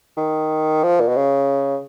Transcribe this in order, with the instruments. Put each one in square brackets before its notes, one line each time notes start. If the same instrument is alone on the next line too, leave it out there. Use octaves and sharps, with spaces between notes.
[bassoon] D#3
F3
A#2
B2
C#3